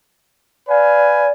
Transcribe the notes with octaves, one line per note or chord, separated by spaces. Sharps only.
B4 D5 F5 G#5